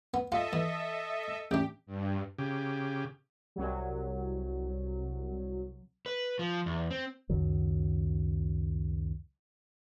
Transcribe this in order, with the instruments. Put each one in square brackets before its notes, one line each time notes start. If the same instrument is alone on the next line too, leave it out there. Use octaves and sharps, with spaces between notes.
[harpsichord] B3
[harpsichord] F4 [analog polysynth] A4 D#5 E5
[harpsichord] E3
[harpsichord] A1 D4 [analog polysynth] G4
[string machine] G2
[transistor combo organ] C#3 G4
[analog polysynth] C2 F#3
[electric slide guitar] B4
F3
E2
C4
[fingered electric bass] C#2 F#2 D#3 F#3